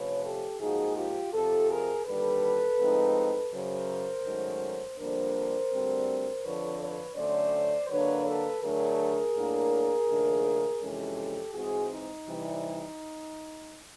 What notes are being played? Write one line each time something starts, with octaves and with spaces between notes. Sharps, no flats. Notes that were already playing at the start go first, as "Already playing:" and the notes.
Already playing: C3 F3 A3 C#4 B4 C#5
G4 A4
G#2 F3 A#3 D#4 F#4 G#4
F4 G4
F2 C3 F3 G4 A4
G#4 A#4
D#2 D3 G3 A4 B4
A2 F3 G#3 C4 D#4
F#2 C#3 F#3 A#4 C5
G#2 D#3 F#3 A3 C#4
F2 D3 G3 A#3 D4 A#4 C5
D2 D3 G3 C4
F2 D3 F3 B4 C#5
B4 C#5
D3 F#3 A3 C#4 C5 D5
D3 F#3 A#3 D4 B4 C#5
A4 B4
D3 F#3 A3 D4 G#4 A#4
A2 F#3 A#3 D4
D#2 C#3 F3 A3 D4
F2 C3 E3 G#3 C#4 G4 A4
G#2 E3 G#3 C4 F#4 G#4
D#4
C3 E3 G3